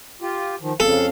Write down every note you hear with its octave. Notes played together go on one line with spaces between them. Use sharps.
F4 G4
D#3 F3
F2 C#3 A4 F5